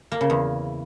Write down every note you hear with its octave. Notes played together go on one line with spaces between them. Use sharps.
A#3
C#3
E2